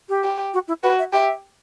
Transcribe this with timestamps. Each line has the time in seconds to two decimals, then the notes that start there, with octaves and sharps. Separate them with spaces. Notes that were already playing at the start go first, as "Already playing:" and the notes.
0.09 G4
0.24 G4
0.54 F#4
0.68 E4
0.83 F#4 B4
0.99 E5
1.13 G4 E5